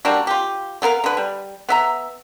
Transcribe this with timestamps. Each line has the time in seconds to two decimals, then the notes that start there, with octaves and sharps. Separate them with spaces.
0.05 G3 A#3 D4 F#4
0.27 F4 G4
0.82 A3 B3 A#4 F5
1.04 D3 B4
1.17 G3
1.69 B3 E5 A#5